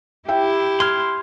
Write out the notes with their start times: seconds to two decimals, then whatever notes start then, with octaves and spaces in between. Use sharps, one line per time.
0.29 E4 G4 E5 G5
0.80 C6 F6 G#6